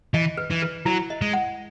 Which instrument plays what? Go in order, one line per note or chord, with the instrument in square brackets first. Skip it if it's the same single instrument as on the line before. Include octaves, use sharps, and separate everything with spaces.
[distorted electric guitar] E3 [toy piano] D#5
[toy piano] B4
[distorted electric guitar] E3
[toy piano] B4
[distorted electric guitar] F#3 [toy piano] E4
[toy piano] D#5
[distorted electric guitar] G#3
[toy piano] F#5